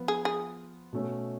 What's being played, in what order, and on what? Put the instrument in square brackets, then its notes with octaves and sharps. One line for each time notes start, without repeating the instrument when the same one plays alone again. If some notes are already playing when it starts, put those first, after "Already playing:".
Already playing: [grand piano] F3 B3 F4
[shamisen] G#4
G#4
[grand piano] B2 A3 C#4